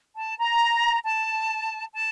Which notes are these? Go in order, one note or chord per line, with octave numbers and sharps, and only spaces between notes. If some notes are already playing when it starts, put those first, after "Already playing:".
A5
A#5
A5
A5